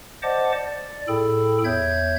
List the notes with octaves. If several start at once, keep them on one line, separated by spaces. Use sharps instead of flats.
C5 D5 D#5 F#5 A5 D6
D5
A2 G#4 A4 G5 B5
E2 C#5 E5 G6 G#6